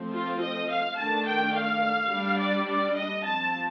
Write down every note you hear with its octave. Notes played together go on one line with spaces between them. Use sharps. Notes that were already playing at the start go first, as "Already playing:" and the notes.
Already playing: F3 A3 C4
F4
D#5
F5
D#3 A3 D4 A5
G5
F5
G3 D4
D5
D5
D#5
F3 C4 A5